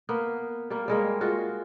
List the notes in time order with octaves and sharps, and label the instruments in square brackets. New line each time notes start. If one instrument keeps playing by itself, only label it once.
[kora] A#3 B3
G3 A#3
G3 G#3 A#3
G#3 F4 F#4